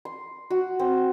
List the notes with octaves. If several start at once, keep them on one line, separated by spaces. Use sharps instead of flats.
C6
F#4
C4